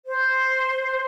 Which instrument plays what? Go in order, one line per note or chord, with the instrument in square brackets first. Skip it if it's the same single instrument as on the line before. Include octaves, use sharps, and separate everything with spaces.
[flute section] C5